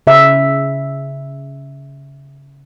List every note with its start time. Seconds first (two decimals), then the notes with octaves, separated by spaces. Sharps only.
0.07 C#3 E5